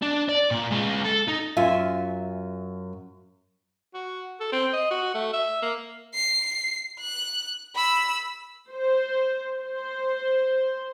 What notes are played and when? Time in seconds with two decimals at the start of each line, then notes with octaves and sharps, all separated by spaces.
0.02 D4
0.29 D5
0.51 A#2
0.71 G#3 F4
1.04 A4
1.28 D#4
1.57 F#2 F4 E5 G#5
3.94 F#4
4.40 A4
4.52 C4
4.73 D#5
4.91 F#4
5.14 A3
5.33 E5
5.62 A#3
6.14 C7
7.00 F#6
7.76 B5 E6
8.70 C5
9.58 C5